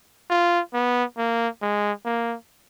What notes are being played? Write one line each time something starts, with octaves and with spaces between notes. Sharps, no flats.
F4
B3
A#3
G#3
A#3